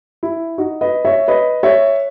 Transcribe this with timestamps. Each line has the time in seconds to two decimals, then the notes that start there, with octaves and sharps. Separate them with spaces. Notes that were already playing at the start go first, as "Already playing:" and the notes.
0.23 E4
0.58 D#4 F#4
0.81 B4 D#5
1.05 C#5 E5
1.28 B4 D#5
1.63 C#5 E5